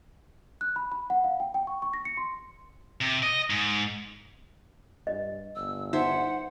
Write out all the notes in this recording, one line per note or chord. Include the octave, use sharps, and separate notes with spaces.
F#6
B5
B5
F#5
F5
G5
G5
C#6
C#6
A#6
C#7
C6
C3
D#5
G#2
G2 D#5
G1 E6
D#4 C5 E5 F#5